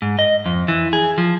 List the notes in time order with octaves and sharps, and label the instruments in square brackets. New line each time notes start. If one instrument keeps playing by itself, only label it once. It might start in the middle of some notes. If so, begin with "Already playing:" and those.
[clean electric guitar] G#2
D#5
F2
E3
G#4
F3